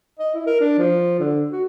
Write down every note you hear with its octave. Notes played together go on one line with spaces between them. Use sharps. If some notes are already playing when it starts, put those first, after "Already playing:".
D#5
E4
A#4
D4
F3
D3
F#4